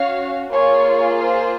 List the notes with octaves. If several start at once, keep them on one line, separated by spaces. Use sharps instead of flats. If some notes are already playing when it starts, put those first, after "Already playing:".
Already playing: C#4 F#4 C#5 F5
A#3 F4 G#4 C#5
C5